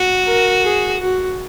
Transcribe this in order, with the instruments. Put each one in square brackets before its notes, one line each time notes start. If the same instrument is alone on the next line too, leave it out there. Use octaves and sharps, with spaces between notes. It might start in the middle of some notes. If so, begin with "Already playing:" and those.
Already playing: [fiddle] F#4
[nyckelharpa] A#4
G#4
F#4